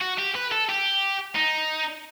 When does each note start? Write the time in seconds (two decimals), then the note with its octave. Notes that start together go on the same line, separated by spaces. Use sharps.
0.02 F#4
0.19 G4
0.35 B4
0.52 A4
0.69 G4
1.36 D#4